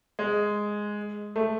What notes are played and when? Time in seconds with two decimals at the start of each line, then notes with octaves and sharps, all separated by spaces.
0.19 G#3
1.36 A3